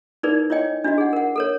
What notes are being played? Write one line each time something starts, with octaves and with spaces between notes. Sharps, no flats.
D#4 E4 G#4 A#4 B4 D5
E4 C#5 D#5 G5 G#5
D4 E4 F#4 D#5
G#4 F#5
A#4 F#5
A4 A#4 C#5